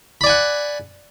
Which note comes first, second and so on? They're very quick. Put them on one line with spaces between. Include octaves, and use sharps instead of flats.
B5 D5 G#5 F#5